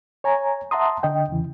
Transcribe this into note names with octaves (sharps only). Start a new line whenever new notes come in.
C#5 G#5 A#5
E5 F#5 A5 A#5 C6 D#6
D3 D#5 G5
E2 C#3 E3